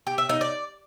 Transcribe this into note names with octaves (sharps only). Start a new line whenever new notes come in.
G4
E5
D#4
D5